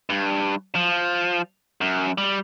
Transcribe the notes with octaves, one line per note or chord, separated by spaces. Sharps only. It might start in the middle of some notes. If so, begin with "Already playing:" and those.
G2
F3
F#2
G3